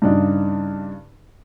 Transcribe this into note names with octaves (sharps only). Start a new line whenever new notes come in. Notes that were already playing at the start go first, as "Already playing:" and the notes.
G2 C#3 D4 D#4